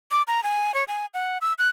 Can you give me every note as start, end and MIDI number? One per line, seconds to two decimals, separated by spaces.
0.11 0.22 86
0.27 0.43 82
0.43 0.74 80
0.74 0.84 73
0.88 1.06 80
1.14 1.38 78
1.42 1.53 88
1.59 1.68 90